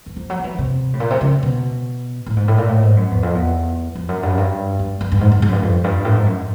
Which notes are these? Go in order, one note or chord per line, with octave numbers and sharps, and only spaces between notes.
E3
F3
F#3
F3
E3
C3
A2
A#2
C3
C#3
B2
A2
G#2
A2
A#2
A2
G#2
F#2
E2
F2
E2
F2
F#2
G2
F#2
G2
G2
G2
G2
G#2
G#2
G#2
F#2
G2
F2
G2
A2
G#2
F#2